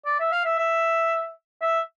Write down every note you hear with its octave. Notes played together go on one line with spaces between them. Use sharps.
D5
E5
F5
E5
E5
E5